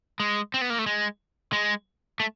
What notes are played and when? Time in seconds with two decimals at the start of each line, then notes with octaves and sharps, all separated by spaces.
0.20 G#3
0.54 C4
0.61 B3
0.70 A#3
0.79 A3
0.86 G#3
1.53 G#3
2.20 A3